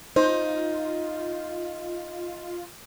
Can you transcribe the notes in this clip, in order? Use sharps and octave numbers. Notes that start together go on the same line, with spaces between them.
D#4 F4 C5